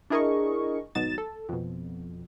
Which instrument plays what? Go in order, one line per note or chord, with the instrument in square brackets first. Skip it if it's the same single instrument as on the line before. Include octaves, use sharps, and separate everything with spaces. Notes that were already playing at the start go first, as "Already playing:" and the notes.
[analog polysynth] D4 E4 G#4 A#4 D#5 C#6
G#1 B2 F#3 D#4 A6 E7
A4
F2 B2